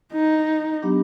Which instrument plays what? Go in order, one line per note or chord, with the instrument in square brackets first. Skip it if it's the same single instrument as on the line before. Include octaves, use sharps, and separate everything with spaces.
[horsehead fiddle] D#4
[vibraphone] F#3 B3 D4 G4